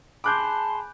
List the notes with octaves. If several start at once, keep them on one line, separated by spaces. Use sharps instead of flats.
G#4 G#5 A5 B5 C6 D6 F#6 G6